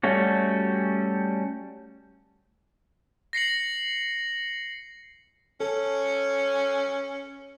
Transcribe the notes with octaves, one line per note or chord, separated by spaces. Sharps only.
G3 A3 C#4 F#4
A#6 C7 C#7 F#7
C#4 A4